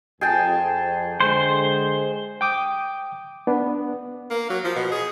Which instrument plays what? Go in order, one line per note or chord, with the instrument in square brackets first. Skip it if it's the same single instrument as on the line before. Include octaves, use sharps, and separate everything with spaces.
[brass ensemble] F2 [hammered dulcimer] G#4 G5 A5
[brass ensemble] D3 G#3 [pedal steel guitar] C5
[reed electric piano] G5 D6 D#6
B3 D4
[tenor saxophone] A#3
F#3
F3
B2
G#4